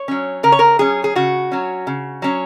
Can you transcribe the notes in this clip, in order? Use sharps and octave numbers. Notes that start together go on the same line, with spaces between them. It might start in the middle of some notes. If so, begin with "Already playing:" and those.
Already playing: C#5
F#3 C#4
C#3 A#4
C#5
A#4
F#3 C#4 G#4
G#4
C#3 F#4
F#3 C#4
C#3
F#3 C#4